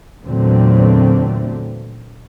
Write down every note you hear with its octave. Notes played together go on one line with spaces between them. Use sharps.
E2 A#2 D3 F#3 A3 C4